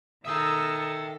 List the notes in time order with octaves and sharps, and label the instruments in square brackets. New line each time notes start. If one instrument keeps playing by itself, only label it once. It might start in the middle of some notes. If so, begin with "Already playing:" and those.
[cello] D#3 A4 [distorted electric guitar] E5 G5 [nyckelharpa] A#5 D#6 [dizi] E6